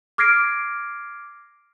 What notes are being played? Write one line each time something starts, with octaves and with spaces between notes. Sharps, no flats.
D6 F6 G#6 A#6 C7 D7